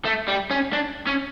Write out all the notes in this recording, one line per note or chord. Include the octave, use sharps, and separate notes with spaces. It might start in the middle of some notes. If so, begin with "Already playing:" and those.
A3
G3
C#4
D4
C#4